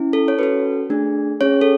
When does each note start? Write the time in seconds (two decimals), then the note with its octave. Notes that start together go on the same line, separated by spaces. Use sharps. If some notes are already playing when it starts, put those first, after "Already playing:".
Already playing: C#4 E4
0.13 A4
0.28 C#5
0.39 C#4 F#4 A4 B4
0.90 A3 D4 G#4
1.41 C#4 G#4 C#5
1.61 A4